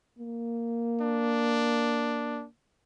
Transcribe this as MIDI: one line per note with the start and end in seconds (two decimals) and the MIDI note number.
0.18 2.46 58
1.01 2.45 62